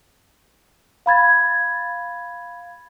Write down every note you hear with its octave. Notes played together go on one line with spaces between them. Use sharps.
F5 B5 G#6 A6